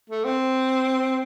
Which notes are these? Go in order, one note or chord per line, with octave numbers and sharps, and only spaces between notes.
A3
C4